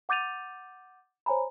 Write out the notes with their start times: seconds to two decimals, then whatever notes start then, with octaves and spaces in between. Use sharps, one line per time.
0.09 F#5 D6 G6 A6 D#7 F7
1.26 C5 C#5 G#5 A#5 B5